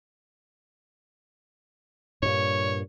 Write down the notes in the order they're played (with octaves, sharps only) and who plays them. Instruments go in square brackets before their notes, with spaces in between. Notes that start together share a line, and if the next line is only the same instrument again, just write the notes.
[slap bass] G2 A#2 [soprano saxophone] C#5